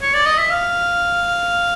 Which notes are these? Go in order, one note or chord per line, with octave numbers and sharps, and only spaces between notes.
C#5
D5
D#5
E5
F5